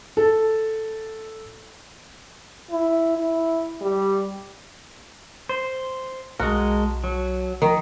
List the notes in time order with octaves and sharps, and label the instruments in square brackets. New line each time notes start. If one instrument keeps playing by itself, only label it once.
[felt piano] A4
[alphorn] E4
E4
G3
[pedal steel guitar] C5
[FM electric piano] B1 A5 [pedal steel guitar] G#3 A#4 [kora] F#4
[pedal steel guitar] F#3
[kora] D#3 [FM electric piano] F3